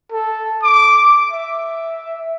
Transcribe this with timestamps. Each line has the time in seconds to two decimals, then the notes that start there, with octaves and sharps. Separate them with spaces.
0.12 A4
0.63 D6
1.31 E5